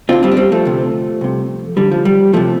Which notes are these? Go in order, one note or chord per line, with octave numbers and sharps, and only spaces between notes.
D2 D3 C4 F4
G3 C4
D4
G3 C4
F3 A3
D2 C3
C2 C3
D2 D3 G3
F3
G3
F2 C3 F3 A3